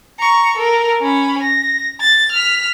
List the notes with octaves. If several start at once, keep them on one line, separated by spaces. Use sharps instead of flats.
A#5 C#6
A4 A#4
C#4 B5
A#6
A6
F6 B6